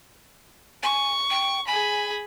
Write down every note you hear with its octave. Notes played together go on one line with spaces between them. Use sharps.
G#5 C#6
G5
G#4 G#5 B5